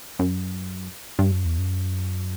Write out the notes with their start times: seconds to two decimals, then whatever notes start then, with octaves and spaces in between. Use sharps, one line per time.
0.19 F#2
1.19 G2
1.32 F#2
1.45 E2
1.58 F#2